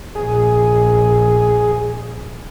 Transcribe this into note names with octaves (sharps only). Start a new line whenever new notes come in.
A#1 G#4